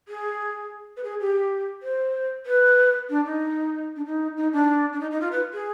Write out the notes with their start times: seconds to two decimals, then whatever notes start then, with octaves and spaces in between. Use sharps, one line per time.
0.08 G#4
0.97 B4
1.04 G#4
1.20 G4
1.83 C5
2.46 B4
3.10 D4
3.25 D#4
3.96 D4
4.05 D#4
4.37 D#4
4.53 D4
4.93 D4
5.00 D#4
5.11 D#4
5.21 F4
5.32 B4
5.54 G#4